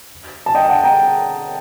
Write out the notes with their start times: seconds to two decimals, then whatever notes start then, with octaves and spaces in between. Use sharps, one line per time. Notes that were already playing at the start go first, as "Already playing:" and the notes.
0.46 A5
0.55 D#5 G5
0.69 F#5 A5
0.83 G5 A#5